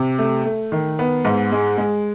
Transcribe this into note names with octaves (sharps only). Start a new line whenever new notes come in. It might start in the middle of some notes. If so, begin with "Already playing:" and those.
Already playing: C3
A3
A3
D#3
B3
G#2
G#3
G#3